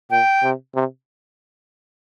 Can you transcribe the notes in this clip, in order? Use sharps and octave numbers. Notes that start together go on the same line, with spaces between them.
A#2 G5
C3
C3